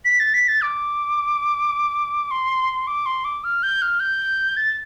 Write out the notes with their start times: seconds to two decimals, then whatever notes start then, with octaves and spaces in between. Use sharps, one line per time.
0.05 B6
0.20 A6
0.34 B6
0.48 A6
0.62 D6
2.31 C6
2.87 D6
3.06 C6
3.25 D6
3.44 F6
3.63 G6
3.82 F6
4.00 G6
4.57 A6